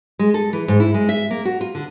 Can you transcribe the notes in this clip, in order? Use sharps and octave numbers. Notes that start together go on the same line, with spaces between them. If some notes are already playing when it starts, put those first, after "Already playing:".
G#3
A4
E3
G#2
E4
G#3
E5
A#3
F#4
F4
D3